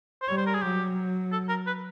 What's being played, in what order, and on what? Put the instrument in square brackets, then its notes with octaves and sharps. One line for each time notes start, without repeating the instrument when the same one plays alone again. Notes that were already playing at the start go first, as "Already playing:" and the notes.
[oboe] C5
[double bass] G3 [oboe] C#5
[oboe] C5
A#4
G#4
[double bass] F#3 [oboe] G4
[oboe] A4
A#4
B4